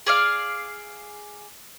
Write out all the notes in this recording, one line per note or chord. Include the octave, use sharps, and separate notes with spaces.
G#4 D5 F5